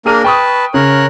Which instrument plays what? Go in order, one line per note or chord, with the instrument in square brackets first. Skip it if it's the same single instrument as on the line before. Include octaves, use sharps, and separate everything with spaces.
[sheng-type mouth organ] A#3 D4 A#4 [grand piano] G#4 F6 D#7
[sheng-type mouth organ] B4 A5 [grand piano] G5 C#6 D#6
[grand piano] C#3 [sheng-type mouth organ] A#4 C#5 F#6